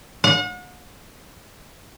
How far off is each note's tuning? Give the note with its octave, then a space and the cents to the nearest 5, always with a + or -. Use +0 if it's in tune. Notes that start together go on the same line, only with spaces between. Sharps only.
F#5 -40